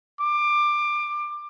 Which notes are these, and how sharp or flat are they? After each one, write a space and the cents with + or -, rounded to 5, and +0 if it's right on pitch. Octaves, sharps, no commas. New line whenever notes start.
D6 +20